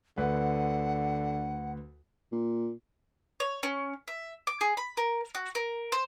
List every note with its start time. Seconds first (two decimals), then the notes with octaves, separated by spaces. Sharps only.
0.17 D2 D3 B4 F#5
2.32 A#2
3.40 C#5
3.63 C#4
4.08 E5
4.47 D6
4.61 G#4
4.77 B5
4.97 A#4
5.35 F#4
5.55 A#4
5.92 C5